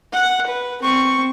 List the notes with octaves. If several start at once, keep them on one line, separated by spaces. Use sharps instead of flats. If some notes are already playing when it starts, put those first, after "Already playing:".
F#5
B4
C4 C#6